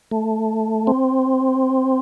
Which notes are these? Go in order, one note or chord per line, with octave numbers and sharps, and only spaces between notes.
A3
C4